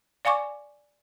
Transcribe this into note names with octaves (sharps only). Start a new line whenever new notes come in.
D5 F5 G#5 C#6 D6